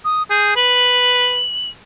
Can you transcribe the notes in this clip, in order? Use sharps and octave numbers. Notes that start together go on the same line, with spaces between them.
D#6
G#4 G6
B4 F#7